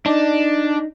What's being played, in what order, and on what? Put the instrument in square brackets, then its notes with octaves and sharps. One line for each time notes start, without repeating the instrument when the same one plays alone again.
[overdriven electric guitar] D4 [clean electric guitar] D#4